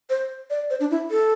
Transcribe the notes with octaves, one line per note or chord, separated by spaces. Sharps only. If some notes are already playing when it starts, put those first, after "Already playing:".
C5
D5
C5
D4
E4
A4